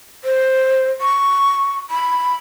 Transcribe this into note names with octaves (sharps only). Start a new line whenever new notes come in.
C5
C#6
B5